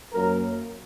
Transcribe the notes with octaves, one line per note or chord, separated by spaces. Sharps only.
F#2 F#3 A#3 A#4